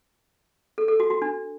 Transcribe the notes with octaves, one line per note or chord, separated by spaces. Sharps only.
A4
A4
F#4
F#4
D4